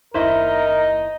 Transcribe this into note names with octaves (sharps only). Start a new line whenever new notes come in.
F#1 D#2 D#4 E4 A#4 C5 D#5